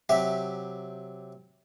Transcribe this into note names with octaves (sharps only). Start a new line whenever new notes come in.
C3 F#3 G4 E5